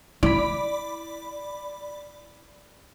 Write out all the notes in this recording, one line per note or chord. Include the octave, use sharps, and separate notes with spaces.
E4 D5 B5